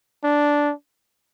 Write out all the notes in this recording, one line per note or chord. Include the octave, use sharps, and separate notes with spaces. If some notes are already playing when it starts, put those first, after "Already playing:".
D4